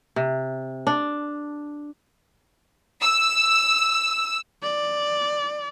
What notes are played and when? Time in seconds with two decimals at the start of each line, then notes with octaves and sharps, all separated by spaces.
0.16 C3
0.87 D4
3.02 E6
4.63 D5